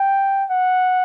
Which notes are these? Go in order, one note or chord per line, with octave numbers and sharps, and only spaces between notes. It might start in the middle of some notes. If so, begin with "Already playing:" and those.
Already playing: G5
F#5